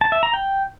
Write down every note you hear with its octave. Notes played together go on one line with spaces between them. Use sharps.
A5
E5
A#5
G5